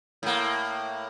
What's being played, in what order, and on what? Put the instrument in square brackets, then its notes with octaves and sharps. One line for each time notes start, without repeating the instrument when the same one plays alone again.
[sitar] A2 A#3